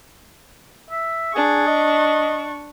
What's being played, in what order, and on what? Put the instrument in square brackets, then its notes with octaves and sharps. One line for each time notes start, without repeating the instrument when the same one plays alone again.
[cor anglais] E5
[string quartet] D4 C#6 [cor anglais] G#4
[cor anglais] D#5